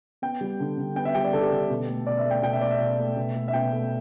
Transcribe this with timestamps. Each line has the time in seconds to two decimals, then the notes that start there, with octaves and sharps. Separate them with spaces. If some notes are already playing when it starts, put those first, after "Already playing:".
0.22 B3 G5
0.41 G3
0.60 D3
0.78 D3
0.96 B3 G5
1.05 E5
1.15 G3 G5
1.24 D5
1.33 D3 A4
1.41 G4
1.49 D3 A4
1.70 B2
1.88 A3
2.07 B2 D5
2.18 E5
2.25 A3
2.31 G5
2.43 B2 G5
2.53 E5
2.61 A3 D5
2.71 E5
2.80 B2
2.99 A3
3.17 B2
3.35 A3
3.48 E5
3.53 B2 G5
3.72 A3